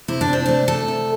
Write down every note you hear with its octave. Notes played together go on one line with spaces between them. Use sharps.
C3 E4
D4
C3 C4
A3 D4
A3 A4
C3